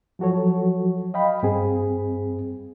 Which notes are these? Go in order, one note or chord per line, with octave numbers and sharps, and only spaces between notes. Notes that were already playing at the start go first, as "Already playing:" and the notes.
F3 F#3 F#4 A4 C#5
D#5 F5 G5 B5
G2 C4 G#4